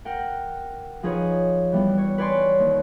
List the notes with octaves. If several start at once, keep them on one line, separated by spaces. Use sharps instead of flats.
A#4 F#5 G5
F3 D#4 G#4 B4 C#5
E3 G3 B3
C#5
B4 C#5 D5 G#5 C6
D#2